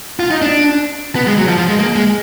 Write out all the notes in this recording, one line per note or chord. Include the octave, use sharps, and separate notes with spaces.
F4
D#4
D4
B3
G#3
F#3
F3
F3
G#3
A#3
G#3